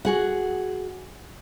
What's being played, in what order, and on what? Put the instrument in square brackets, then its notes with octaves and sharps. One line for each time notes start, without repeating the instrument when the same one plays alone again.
[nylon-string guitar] F#4 G#4 F#5